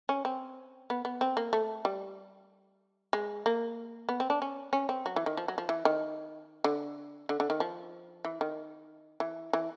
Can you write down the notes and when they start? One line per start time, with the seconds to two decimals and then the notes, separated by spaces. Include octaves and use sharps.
0.09 C#4
0.25 C4
0.90 B3
1.05 B3
1.21 C4
1.37 A#3
1.53 A3
1.85 G3
3.13 G#3
3.46 A#3
4.09 B3
4.20 C4
4.30 D4
4.42 C#4
4.73 C#4
4.89 C4
5.06 F#3
5.16 E3
5.26 D#3
5.37 F3
5.48 F#3
5.58 F3
5.69 E3
5.85 D#3
6.64 D3
7.29 D3
7.40 D3
7.50 D#3
7.60 F3
8.25 E3
8.41 D#3
9.20 E3
9.53 E3